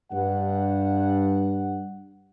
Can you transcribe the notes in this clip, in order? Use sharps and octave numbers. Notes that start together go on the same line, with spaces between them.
G2 F#5